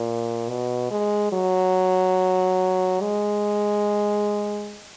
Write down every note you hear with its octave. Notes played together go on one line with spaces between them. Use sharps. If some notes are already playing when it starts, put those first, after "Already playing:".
Already playing: A#2
B2
G#3
F#3
G#3